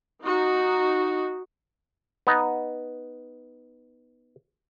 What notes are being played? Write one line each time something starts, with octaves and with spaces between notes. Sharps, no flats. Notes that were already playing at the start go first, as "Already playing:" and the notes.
D#4 F#4
B3 D#4